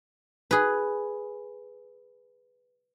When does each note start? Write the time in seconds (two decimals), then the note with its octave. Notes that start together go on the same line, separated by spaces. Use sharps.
0.51 G#4 B4